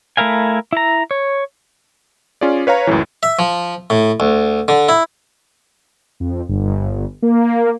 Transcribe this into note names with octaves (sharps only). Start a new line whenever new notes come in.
A3 E4 A#4 F5 G#5
E4 A#5
C#5
C#4 F4 G#4 D5
B4 C#5 F5 A#5
C#2 F#2 A2 E3
E5
F3
A2
D2
D3
E4
F2
G1
A#3